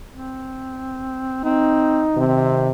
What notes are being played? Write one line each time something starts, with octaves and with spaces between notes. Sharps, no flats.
C4
C4 D#4
C3 D#3 C4